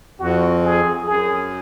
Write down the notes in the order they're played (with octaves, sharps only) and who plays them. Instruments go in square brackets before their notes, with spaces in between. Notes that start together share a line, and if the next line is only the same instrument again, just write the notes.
[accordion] F2 [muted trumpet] F#4
[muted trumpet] G#4
[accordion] F2
[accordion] F#2 [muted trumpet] G#4